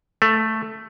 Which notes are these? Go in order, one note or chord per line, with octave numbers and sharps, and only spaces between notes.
A3